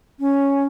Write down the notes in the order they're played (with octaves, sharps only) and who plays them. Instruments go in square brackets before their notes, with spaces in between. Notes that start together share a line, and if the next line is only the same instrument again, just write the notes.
[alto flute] C#4